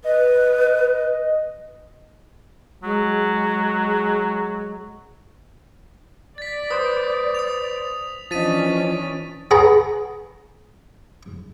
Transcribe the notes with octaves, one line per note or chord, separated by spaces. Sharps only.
B4 D#5
F#3 G#3
D5 A6 B6
B4 C5 D#6
D#6 F7
E3 F3 C#4 D4 D#5 A6 B6 D#7
G#4 B4 F#5 A#5